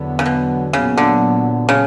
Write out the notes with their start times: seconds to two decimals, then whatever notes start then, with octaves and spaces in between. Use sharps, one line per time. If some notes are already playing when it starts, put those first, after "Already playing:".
Already playing: E2 D3 F#3 B3
0.19 C#3
0.26 B2
0.73 A#2 C#3 F#3 B3
0.98 D3
1.69 C#3